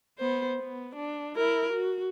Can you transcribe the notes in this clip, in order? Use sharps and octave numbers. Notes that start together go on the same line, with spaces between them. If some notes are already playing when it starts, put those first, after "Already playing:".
B3 C5
B3
D4
E4 A#4
F#4